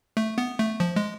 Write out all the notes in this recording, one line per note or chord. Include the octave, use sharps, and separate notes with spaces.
A3
B3
A3
F3
G#3